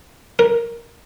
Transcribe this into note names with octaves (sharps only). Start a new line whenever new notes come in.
A#4